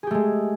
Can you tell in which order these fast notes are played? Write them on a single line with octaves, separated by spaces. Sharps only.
G#4 G4 A3 G#3